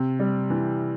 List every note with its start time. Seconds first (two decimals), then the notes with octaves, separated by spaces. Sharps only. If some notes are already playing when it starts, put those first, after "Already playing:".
Already playing: C3
0.19 G3
0.50 E3